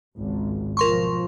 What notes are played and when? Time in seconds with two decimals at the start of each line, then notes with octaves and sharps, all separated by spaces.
0.17 G#1 C#2
0.77 B1 F3 A#4 C6 C#6